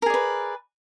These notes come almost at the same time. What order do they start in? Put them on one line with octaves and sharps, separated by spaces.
A#4 G#4 D5 B4